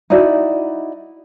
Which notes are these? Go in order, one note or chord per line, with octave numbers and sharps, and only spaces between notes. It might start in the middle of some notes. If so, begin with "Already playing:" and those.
D#4 E4 F#4 D5